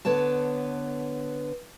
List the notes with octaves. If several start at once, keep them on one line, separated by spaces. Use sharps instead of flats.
D3 B3 C#5 A5